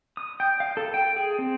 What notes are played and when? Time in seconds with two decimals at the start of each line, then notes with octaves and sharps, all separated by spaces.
0.17 D#6
0.40 G5
0.60 F5
0.77 A4
0.94 G5
1.16 G#4
1.39 C4